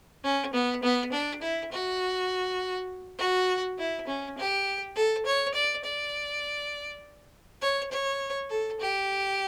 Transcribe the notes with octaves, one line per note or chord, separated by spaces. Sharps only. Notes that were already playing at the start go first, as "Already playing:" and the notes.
C#4
B3
B3
D4
E4
F#4
F#4
E4
C#4
G4
A4
C#5
D5
D5
C#5
C#5
A4
G4